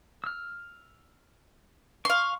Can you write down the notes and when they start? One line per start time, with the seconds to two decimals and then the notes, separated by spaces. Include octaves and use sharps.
0.24 E6 F6
2.05 F5 C6 C#6